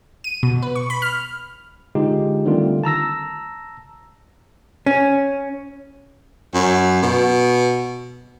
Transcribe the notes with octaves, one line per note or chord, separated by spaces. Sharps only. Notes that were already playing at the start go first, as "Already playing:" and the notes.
D#7
B2
B4
C#6
B5
F6
D3 G#3 D#4 F4 G4
D3 D#3 G3 A3 C4 F4
A5 A#5 E6 A#6
C#4
F#2
B2